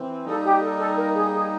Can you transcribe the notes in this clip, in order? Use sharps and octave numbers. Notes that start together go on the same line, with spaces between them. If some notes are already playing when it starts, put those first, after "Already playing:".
Already playing: E3 C4
G3 A#3 D#4 A4
G4
A4
A4
A#4
G#4
G#4